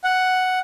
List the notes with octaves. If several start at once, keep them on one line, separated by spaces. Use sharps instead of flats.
F#5